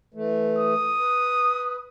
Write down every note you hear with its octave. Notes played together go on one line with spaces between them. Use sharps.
E3 A3
D#6
B4